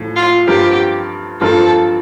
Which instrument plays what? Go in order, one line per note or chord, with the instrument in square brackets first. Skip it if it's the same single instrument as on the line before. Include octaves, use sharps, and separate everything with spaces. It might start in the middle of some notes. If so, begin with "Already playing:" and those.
Already playing: [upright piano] A2 F3
[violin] F4
[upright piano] G2 F3 C4 F4 A#4 [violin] G4
[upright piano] G2 F3 C4 F4 A#4 [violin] A4